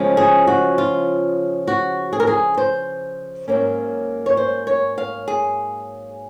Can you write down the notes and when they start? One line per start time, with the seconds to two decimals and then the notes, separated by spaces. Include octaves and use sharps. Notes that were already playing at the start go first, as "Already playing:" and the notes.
Already playing: C#3 F3 G#3 C#4
0.17 G#4
0.47 F#4
0.78 F4
1.67 F#4
2.13 G#4
2.20 A#4
2.27 G#4
2.57 C5
3.48 G#2 F#3 A#3 C#4
4.26 C#5
4.37 C5
4.67 C#5
4.98 F5
5.28 G#4